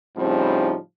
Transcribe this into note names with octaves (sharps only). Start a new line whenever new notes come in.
A2 C#3 F3 G3 C4 D#4